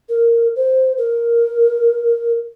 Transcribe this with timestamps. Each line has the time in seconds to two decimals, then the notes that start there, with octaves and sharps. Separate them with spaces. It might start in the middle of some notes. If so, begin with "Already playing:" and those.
0.09 A#4
0.56 C5
0.98 A#4